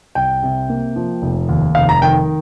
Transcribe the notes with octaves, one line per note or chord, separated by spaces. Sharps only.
C2 G5
C3
A#3
F3
F1
D#2
F1 F5
A#5
D#3 G5